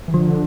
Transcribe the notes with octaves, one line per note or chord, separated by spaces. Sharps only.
E3
D3 F3